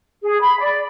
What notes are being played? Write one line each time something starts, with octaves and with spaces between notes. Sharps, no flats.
G#4
B5
D5